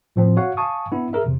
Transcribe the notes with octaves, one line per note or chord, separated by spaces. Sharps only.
A2 F3 C4
F#4 C#5 F5 F#5
F5 G#5 A5 C#6 D#6
B3 D4 E4
G#4 A#4 E5
E2 C3